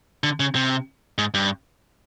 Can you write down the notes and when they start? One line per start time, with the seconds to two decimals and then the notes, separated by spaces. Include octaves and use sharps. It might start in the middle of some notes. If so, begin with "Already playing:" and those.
0.24 D3
0.40 C#3
0.55 C3
1.18 G#2
1.34 G2